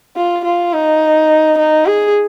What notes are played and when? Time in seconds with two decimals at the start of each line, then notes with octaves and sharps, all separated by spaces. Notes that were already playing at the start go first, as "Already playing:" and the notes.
0.17 F4
0.45 F4
0.73 D#4
1.58 D#4
1.86 G#4